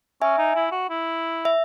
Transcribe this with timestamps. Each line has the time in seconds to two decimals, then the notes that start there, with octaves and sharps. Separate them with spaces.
0.22 C#4 E5 G#5
0.38 D#4
0.56 E4
0.72 F#4
0.90 E4
1.45 E5